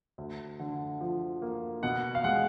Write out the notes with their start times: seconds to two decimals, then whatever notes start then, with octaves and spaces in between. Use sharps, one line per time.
0.18 D2
0.60 D3
1.01 F3
1.42 A#3
1.83 B2 F#5
2.15 F5
2.24 G#3 F#5